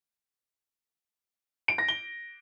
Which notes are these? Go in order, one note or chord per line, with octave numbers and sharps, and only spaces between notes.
D7
A#6
G7